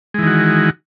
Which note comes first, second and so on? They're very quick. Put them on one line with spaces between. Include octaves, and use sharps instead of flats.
G#3 E3 D#3 F#4